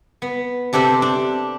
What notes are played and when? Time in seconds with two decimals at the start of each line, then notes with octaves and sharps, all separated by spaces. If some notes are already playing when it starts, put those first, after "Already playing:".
0.22 B3
0.73 C3 D4 G4 A4 C5
1.02 D4